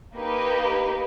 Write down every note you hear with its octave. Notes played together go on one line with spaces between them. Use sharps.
A#3 D#4 G4 B4